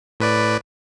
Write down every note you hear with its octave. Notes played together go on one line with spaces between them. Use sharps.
A2 B4 D5